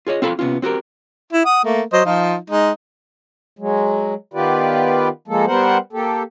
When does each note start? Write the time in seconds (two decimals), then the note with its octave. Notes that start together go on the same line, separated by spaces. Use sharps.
0.07 F4 G#4 C#5 D#5
0.22 C4 F4 A4 F5 B5
0.39 C3 B3 C#4 F4
0.62 C4 F#4 G4 A#4
1.33 E4
1.46 F#5 D#6
1.64 A3 A#3
1.93 F#3 C5 D#5
2.05 F3 D#4 F4
2.50 G#3 D#4
3.59 F#3 G#3
4.34 D#3 B3 F4 G4 B4 D5
5.28 F3 G#3 A#3 A4
5.47 G3 B3 A#4 C5 F#5
5.93 A#3 G4 A4